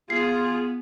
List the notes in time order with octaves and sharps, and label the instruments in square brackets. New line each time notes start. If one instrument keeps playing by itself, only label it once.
[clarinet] B3 [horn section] F4 [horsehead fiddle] G#4 [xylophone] C7